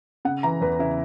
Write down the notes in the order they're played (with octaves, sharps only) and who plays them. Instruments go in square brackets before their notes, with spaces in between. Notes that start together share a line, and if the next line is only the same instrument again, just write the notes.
[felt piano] C#3 F#5
E3 A#5
E2 B4
C#3 E4